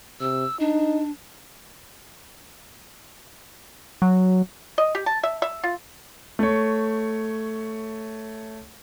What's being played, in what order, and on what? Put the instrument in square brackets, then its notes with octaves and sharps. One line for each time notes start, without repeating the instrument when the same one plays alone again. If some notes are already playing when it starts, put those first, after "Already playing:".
[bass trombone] C3 [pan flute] E6
[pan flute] D4 [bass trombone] D#4
[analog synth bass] F#3
[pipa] D#5
G4
A5
E5
E5
F4
[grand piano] A3 C#5